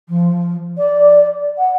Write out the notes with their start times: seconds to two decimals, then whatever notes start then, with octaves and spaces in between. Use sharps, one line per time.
0.08 F3
0.78 D5
1.58 F#5